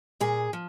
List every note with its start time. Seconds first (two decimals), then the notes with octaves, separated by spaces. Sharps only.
0.20 A#2 G#4
0.53 F3